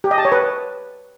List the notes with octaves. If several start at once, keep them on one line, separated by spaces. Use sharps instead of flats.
G4
D#5
A5
C#5
B4